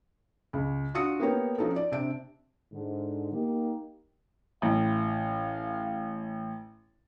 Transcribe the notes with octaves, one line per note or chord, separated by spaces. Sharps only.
C#2
D4 F4 F#4 D#6 C#7
A#3 B3 D#4 G4 A#4 C#5
F3 C#4 D#4 F#4 A4
D5
C3 D4 D7
G#2 D3
A#3 D#4 G4
A1 F5